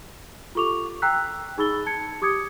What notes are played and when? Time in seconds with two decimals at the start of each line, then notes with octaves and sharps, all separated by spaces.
0.55 F4 G4 A4 C#6 D6 F7
1.02 G5 A#5 E6 F#6 B6
1.58 D#4 G#4 B5 E6 A6 G7
1.86 A5 G#6 C#7
2.22 G4 D6 D#6 G#6 C#7